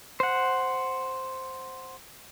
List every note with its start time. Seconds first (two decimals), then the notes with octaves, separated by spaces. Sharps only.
0.20 C5 F#5